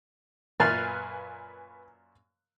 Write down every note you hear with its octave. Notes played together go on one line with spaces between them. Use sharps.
F#2 A#2 B4 F5 G#5 F6 F#6 A6